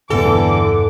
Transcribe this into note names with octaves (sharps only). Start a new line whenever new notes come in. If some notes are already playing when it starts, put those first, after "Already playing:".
E1 G2 D3 E3 B3 A4 D6